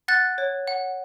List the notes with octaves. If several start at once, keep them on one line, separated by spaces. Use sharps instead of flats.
F#5 F#6 A6
C#5
F#5